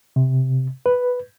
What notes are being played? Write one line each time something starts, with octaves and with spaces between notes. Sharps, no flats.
C3
B4